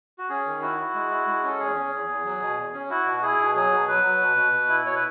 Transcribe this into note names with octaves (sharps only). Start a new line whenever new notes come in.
F#4
C#4 G#4
D#3
E4 F#4
E4
G#3
E4
G#3
C#4 A4
E2 G#4
C#4
E2
E2
F#3
B2
E2
C#4
E4 F#4
B2
F#4
E4 G#4
B2
F#3 G#4
B2
F#3 B4
F#3
B2
B2
B2
E4
B2 C#5
B4